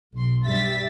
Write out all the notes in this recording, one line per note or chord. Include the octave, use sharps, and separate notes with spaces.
B1 C6
G2 G3 E5 A6 B6